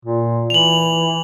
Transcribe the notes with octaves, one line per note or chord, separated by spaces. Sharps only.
A#2
E3 F7 F#7